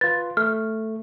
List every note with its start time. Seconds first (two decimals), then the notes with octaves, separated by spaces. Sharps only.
0.01 F4 B4 A6
0.37 A3 F6